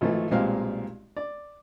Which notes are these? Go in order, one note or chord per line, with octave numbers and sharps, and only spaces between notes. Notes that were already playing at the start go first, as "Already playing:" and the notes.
G#1 E3 F3 A3
B1 A#2 G3 G#3 C4 F5
D5